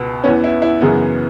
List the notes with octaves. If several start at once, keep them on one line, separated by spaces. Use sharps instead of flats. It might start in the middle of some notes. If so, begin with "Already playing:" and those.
Already playing: C#2 B2 B3
E2 E3 B3 C#4
E4
E4
F#2 C#3 E3 G#3 B3